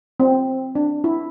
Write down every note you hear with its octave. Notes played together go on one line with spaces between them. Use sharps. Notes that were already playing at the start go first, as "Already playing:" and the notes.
C4
D4
E4